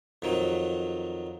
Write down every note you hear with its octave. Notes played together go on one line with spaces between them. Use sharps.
F2 D#3 F#3